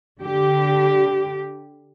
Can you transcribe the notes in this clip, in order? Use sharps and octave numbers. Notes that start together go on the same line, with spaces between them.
D3 G4